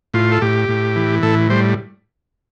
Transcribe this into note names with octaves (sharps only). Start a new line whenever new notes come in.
A2 F4
A4
A2 G4
A2
E3
A2 A4
G3 C5